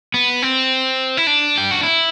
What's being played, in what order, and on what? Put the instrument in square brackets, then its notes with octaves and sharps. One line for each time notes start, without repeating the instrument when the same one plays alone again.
[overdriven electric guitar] B3
C4
E4
D4
G4
F#4
E4